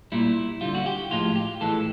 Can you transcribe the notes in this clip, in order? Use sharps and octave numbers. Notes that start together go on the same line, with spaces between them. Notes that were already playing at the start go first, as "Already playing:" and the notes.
A#2 G3 E4
D3 G3 F4
F#4
G4
A2 F3 G#3 F4
G4
A2 E3 G#3 A4